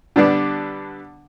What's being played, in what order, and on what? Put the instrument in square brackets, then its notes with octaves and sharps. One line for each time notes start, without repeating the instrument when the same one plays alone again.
[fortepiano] D3 G3 B3 D4